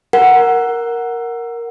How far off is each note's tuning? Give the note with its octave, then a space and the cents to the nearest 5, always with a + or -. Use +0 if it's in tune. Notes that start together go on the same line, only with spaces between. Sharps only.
A#4 +0 F#5 +0